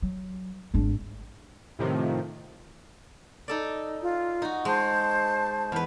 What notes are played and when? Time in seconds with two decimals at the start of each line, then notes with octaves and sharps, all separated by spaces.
0.02 F#3
0.74 G#1 D4
1.79 A2 C3 D#3 F3
3.48 D#4 A4 D5
4.01 F4
4.42 D#4 F#4
4.65 G#3 C5 A5
5.72 E2 B4